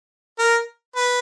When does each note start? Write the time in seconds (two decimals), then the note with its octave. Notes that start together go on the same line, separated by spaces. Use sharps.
0.39 A#4
0.96 B4